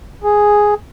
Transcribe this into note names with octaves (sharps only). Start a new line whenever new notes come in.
G#4